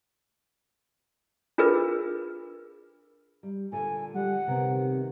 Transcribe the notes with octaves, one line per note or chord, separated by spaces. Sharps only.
D4 F4 G#4 A#4 B4
G3
A#2 D3 A4 G#5
G3 F#5
C3 D#3 A#3 B3